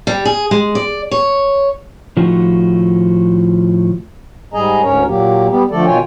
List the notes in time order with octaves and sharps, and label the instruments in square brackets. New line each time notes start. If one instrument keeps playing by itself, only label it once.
[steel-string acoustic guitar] G3
G#4
G#3
D5
C#5
[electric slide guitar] A2 D#3 F3 A3 F#4
[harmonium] G#2 G3 G#4 D#5 G#5 A#5
D2 G#2 C#4 A#4 C#5
A#2 F#3 A#3 G4
G3 B3 G4
D3 F3 A3 A4 D5
B2 D#3 F4 C#5 G5 G#5